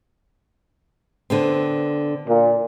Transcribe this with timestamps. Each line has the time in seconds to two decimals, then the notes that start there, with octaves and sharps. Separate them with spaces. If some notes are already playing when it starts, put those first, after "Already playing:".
1.30 D3 B3 C4
2.27 A#2